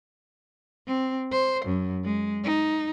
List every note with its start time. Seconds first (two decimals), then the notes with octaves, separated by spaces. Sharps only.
0.87 C4
1.31 C5
1.65 F#2
2.04 G#3
2.44 D#4